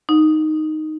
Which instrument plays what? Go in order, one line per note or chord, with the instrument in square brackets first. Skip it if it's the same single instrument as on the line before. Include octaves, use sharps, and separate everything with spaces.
[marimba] D#4